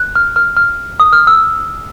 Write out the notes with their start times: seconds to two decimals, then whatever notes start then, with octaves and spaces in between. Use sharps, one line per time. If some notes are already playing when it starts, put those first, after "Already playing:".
Already playing: F#6
0.15 F6
0.36 F6
0.57 F6
1.00 D#6
1.13 F6
1.27 E6